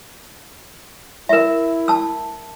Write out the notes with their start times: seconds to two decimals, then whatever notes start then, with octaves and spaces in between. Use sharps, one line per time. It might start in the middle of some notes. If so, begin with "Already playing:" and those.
1.29 E4 A#4 E5
1.88 A5 E6